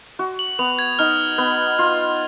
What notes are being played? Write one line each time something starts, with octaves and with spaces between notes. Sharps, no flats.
F#4
F#7
B3 F7
G#6
D#4 F6
B3
F4